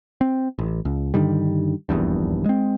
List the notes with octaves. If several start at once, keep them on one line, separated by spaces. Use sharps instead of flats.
C4
A1
C#2
G2 D3 D#3 G3
D#1 A#1 E2 G2
G#3 C4